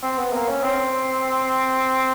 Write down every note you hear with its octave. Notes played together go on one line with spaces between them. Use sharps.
C4
B3
A#3
C#4
C4